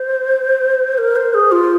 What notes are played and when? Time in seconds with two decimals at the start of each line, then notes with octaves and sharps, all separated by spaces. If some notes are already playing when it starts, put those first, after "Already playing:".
Already playing: C5
0.98 A#4
1.16 C5
1.34 G#4
1.52 F4